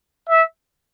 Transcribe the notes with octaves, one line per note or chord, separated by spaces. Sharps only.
E5